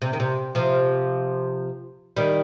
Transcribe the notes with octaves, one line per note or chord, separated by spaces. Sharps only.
C3
D#3
C3
C3 F3
D#3 G3